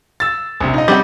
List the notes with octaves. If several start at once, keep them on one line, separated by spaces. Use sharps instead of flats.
E6 A6
A#1 C3
D#4 D#5
G3 C4 F#5